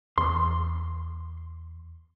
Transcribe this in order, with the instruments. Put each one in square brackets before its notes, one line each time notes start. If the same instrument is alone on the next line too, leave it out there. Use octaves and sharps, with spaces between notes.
[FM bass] E2 [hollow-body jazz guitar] C6